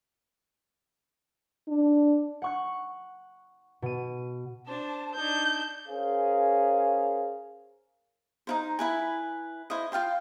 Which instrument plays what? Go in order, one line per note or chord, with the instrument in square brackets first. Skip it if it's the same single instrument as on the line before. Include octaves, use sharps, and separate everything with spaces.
[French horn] D4
[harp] F#5 C#6 F#6
B2 D#7
[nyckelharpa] D4 C5 [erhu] A5
[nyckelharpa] D4 D#4 [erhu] G6
[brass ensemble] C#4 G#4 A#4 C5 F5
[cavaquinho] D#4 E4 C5
E4 B4 G#5
E4 C5 D#5
F4 F5 G5 C6